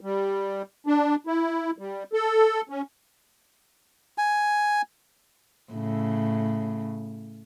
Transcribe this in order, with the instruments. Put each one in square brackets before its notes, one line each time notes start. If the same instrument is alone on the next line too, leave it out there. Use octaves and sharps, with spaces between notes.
[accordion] G3
D4
E4
G3
A4
C#4
[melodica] G#5
[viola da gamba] A2 C#3